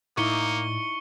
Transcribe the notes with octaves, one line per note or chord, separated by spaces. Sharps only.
A2 A#3 D#4 E4 D5 C#6 C#7 G7